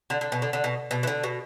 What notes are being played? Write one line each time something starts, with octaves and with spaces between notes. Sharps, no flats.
D3
D3
B2
D3
D3
B2
B2
E3
D3
B2